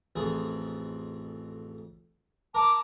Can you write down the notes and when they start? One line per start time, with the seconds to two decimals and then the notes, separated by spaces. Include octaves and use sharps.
0.16 A1 F2 G#4
2.55 A#4 A5 D6